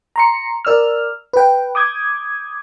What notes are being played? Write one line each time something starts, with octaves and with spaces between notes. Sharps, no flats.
A#5 C6 C#7
A#4 D5 E6 F6
B4 G5
D6 D#6 G6 G#6